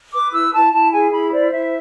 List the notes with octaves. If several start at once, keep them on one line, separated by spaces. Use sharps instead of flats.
B4 D6
E4 E6
E4 A5
E4 A5
G#4 G#5
E4 B5
C5 D5
E4 E5